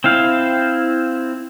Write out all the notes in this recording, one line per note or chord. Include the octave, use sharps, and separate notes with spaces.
C4 E4 F5